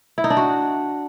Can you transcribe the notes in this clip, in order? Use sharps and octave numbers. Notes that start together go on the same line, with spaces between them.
E4
D#4
D4
F#4